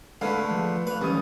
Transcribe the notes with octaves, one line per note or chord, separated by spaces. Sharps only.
D3 G#3 A3 B4 F5
F3
A3 B4 F5
B1 E3 G3 C#4 D#6 D#7